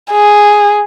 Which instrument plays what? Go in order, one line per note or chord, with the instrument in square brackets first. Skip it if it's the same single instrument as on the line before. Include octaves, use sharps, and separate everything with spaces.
[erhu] G#4